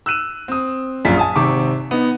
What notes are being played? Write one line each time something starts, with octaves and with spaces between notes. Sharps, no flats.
E6 F#6 D#7 E7
C4 D#6
A#1 F#2 F4 B6
G#5 A5 D#6
G#1 C3 C4 C#6 D6
B3 D#4